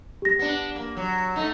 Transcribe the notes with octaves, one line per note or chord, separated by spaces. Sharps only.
G4 A#6
B3 D4
A#3
F#3
A3 D#4